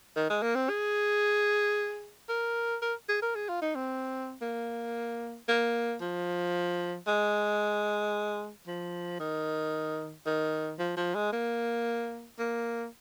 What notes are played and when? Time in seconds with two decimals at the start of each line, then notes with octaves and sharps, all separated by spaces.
0.16 D#3
0.30 G#3
0.42 A#3
0.55 C4
0.69 G#4
2.29 A#4
2.82 A#4
3.09 G#4
3.22 A#4
3.35 G#4
3.49 F4
3.62 D#4
3.75 C4
4.42 A#3
5.48 A#3
6.01 F3
7.07 G#3
8.67 F3
9.20 D#3
10.26 D#3
10.79 F3
10.97 F3
11.15 G#3
11.32 A#3
12.39 A#3